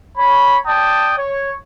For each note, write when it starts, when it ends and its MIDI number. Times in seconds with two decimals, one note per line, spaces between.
0.17 0.56 73
0.17 0.56 83
0.66 1.13 74
0.66 1.13 79
0.66 1.13 81
0.66 1.13 87
1.17 1.52 73